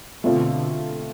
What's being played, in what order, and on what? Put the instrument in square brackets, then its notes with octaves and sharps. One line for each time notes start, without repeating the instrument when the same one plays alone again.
[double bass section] B2 D3 [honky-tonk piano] A3 C4 F4